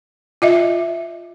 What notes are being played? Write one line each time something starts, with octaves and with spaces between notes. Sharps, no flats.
F4 D#5 E5